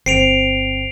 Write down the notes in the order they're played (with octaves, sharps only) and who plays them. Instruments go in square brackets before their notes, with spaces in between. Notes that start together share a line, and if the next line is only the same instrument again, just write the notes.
[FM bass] G1 [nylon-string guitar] C4 [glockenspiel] C7 D7 F7